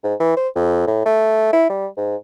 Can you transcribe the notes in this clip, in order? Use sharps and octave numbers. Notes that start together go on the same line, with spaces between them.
G#2
E3
C5
F2
A2
A3
E4
G3
G#2